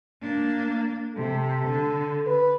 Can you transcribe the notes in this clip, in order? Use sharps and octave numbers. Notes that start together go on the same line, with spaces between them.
A#3 D4
C3 A4
D3
B4